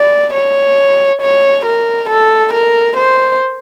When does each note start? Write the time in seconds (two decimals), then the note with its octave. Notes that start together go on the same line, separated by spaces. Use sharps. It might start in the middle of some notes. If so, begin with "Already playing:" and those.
Already playing: D5
0.33 C#5
1.21 C#5
1.66 A#4
2.09 A4
2.53 A#4
2.97 C5